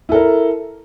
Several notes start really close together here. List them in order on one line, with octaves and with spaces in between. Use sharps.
E4 A4 A#4